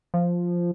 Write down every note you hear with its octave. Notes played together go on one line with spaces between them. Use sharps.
F3